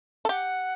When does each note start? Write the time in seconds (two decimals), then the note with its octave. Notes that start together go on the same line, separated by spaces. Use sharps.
0.25 A4
0.29 G4 F#5